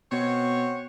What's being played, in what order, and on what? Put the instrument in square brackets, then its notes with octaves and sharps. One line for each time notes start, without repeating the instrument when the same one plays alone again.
[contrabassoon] B2 [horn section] C4 F#4 C#5